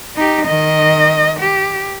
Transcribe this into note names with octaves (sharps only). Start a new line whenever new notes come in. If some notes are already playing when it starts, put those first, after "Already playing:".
D#4 G4
D#3 D#5
G4